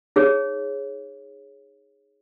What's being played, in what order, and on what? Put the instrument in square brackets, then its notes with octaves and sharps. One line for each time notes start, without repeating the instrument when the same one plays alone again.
[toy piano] D#4 G#4 C#5